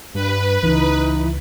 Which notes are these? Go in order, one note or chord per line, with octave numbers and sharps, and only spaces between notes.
G2 B4
C#2 E3 D#4